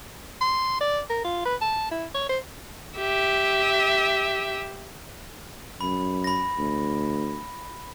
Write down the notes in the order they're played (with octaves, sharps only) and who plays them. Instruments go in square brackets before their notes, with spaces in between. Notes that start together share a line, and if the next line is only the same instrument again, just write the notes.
[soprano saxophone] C6
D5
A#4
F4
B4
A5
E4
C#5
C5
[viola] G4 E5
[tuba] F#2 [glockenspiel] B5
[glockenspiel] B5 A#6
[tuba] D2